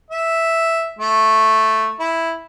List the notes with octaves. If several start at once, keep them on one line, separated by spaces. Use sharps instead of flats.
E5
A3
E4